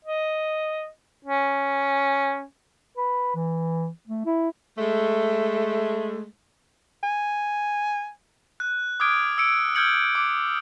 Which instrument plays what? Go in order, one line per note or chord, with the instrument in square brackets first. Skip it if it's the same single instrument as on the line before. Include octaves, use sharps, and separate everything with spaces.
[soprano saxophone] D#5
C#4
[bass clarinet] B4
E3
A3
E4
[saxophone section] G#3 A3
[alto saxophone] G#5
[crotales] F#6
D6 D#6 F6 G#6 D7
E6 C#7 D7
E6 F6 G6 G#6 C#7 F#7
D6